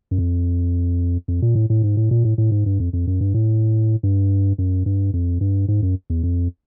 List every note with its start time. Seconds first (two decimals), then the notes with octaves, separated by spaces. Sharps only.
0.11 F#2
0.18 F2
1.28 F2
1.42 A#2
1.55 A2
1.70 A2
1.83 G#2
1.97 A2
2.11 A#2
2.25 A2
2.38 A2
2.52 G#2
2.66 G2
2.80 F2
2.93 F2
3.07 F#2
3.21 G2
3.34 A2
4.03 G2
4.58 F#2
4.86 G2
5.14 F2
5.41 G2
5.68 G#2
5.82 F#2
6.10 E2
6.23 F2